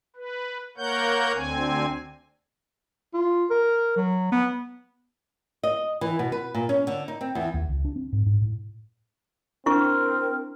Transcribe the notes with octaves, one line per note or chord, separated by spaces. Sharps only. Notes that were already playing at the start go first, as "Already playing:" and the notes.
B4
A#3 A#4 C#5 F#5 G6
D2 D3 C4 G#5
F4
A#4
F#3
B3
D#5
E3
B2
B4
A#2
C#4
D3
D#4
C4
E2
D#2
C#2
D4
C4
G#2
G#2
A2
C4 D4 E4 A#4 C#6